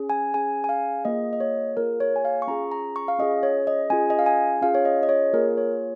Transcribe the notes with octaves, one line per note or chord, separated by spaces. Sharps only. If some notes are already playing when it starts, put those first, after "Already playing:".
Already playing: C#4 G#4
G#5
C#4 G#4 G#5
G#5
F5
A#3 F4 G#4 D#5
D#5
C#5
A#3 F4 G#4 A#4
C#5
G#5
F5
C#6
C#4 F4 G#4 A#5
A#5
C#6
F5
C#4 F4 G#4 D#5
C#5
D#5
C#4 F4 G#4 G#5
D#5
F5
G#5
C#4 F4 G#4 F5
C#5
D#5
D#5
C#5
A#3 F4 G#4 A#4
C#5